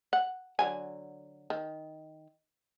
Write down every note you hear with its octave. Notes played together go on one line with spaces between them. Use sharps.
F#5
D3 F#3 G#5
D#3